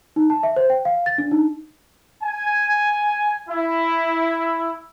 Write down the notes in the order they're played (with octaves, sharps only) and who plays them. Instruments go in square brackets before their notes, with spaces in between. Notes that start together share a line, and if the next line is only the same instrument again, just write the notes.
[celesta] D#4
A5
E5
C5
G5
F5
A6
D4
D#4
[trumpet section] G#5
E4